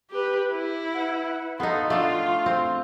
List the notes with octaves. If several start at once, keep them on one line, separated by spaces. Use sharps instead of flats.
G4 B4
E4
B4 F#5
B3 D#4 A4 F5 C6
A3 D4 F4 F5
C4